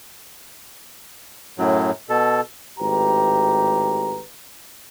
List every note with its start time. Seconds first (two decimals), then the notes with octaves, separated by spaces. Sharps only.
1.58 F#2 A2 F#3
2.09 B2 A4
2.79 G#1 A2 G4 B4 A#5